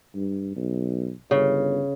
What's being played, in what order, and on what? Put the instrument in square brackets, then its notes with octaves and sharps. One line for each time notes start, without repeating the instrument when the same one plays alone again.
[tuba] G2
B1
[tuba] G1 [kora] C#3